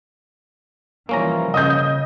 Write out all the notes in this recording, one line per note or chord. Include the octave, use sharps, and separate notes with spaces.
E3 F3 G3 A#3 C#4 A#5
C#3 D#5 D#6 G6